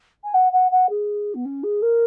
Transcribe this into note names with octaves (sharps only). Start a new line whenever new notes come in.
G#5
F#5
F#5
F#5
G#4
B3
C#4
G#4
A#4